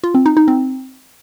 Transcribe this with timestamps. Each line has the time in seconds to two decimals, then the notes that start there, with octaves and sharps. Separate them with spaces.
0.04 F4
0.15 C4
0.26 D#4
0.37 D#4
0.48 C4